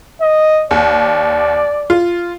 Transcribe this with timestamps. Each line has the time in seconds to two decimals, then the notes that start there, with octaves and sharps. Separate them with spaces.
0.21 D#5
0.71 D#2 D5
1.90 F4